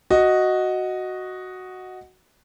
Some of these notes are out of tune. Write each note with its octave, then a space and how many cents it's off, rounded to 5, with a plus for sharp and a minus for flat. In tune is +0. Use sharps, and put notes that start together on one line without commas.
F#4 +0 D#5 +0